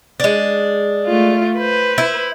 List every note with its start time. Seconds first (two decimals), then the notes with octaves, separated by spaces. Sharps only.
0.20 G#3 D4
1.07 A3 F4
1.57 B4 C5
1.98 E4